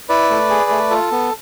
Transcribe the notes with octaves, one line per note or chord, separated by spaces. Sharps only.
E4 B4 D5
A3
G#4
A3
F4 A4
B3